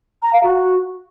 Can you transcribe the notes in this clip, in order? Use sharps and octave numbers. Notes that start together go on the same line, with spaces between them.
A#5
F5
F#4